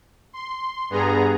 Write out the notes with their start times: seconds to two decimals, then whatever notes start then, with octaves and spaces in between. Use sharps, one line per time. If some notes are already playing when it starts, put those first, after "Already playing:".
0.33 C6
0.90 G2 B3 G#4 A#5